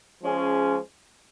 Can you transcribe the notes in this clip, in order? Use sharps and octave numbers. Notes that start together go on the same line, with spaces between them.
F3 G#3 C#4 G#4